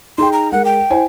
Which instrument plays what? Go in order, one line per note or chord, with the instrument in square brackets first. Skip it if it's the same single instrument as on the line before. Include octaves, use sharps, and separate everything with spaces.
[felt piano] D#4 G#4 G5 [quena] C6
[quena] A#5
[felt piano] G#3 A#4 [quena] F#5
[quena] G5
[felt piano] E4 C5 G#5